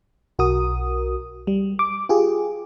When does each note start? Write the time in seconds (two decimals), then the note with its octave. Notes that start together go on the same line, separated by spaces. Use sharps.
0.39 B1 F#4 A#4 D#6
1.47 G3
1.79 D6
2.09 F4 G4 G#4